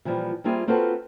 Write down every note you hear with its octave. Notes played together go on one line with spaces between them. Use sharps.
A#2 E3 F3 G3
G3 A#3 C4 E4 F4 G#4
A#3 C4 F4 F#4 A4 B4